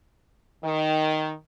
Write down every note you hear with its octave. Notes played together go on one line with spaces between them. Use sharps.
D#3